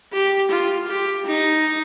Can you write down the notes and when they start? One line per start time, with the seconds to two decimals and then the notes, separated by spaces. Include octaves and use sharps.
0.13 G4
0.51 F4
0.89 G4
1.26 D#4